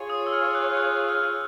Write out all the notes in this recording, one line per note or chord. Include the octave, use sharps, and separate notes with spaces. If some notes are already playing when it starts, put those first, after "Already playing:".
Already playing: F4 G#4 C#5
D#6
E6
F6
F#6
F#6
F6